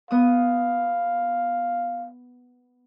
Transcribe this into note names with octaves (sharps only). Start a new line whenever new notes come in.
B3 F5 D#6